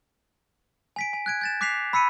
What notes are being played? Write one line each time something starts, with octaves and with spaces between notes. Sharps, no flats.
G#5 B6 D7
G#5
F#6 G#6 D7
G6 A6 E7
D6 F#6 B6 C7 F7
B5 E6 B6 C#7 D#7